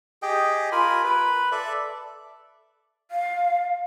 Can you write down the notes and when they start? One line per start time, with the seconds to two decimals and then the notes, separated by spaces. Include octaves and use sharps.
0.22 G4 G#4 D#5 G5
0.72 F4 A#4 G#5 B5
1.04 B4 B5
1.52 A4 D5 E5
3.11 F5